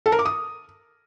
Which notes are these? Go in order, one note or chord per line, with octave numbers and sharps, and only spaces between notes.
A4
A#4
D6
D#6